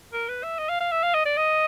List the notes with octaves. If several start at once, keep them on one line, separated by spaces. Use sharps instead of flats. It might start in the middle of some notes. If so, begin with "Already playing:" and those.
A#4
B4
E5
D#5
F5
F5
E5
F5
D#5
D5
D#5